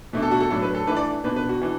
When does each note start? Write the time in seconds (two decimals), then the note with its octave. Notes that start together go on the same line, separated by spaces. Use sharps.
0.13 B2 A3 D4
0.23 A4
0.31 F#4
0.40 A4
0.50 A2 F#3 D4 A4
0.62 B4
0.75 A4
0.87 E3 A3 D4 B4
0.96 D5
1.24 B2 B3 D4 B4
1.36 B4
1.49 F#4
1.62 E3 D4